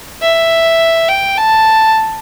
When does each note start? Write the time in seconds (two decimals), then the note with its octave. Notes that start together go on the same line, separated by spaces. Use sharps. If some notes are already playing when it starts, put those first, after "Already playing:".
0.22 E5
1.08 G5
1.37 A5